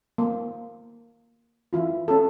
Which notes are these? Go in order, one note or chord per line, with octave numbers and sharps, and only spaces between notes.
A#3
E3 E4 F4
C#4 A4